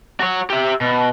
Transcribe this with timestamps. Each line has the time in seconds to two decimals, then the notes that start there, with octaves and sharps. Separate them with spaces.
0.20 F#4 C#5
0.50 G4 E5
0.81 B2